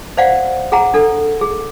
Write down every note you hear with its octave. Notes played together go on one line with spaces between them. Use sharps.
C5 D5 F5 F#5
G#4 F#5 A#5
D4 A4
G#4